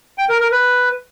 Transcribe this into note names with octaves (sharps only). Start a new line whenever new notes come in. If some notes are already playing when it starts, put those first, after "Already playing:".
G5
A#4
A#4
B4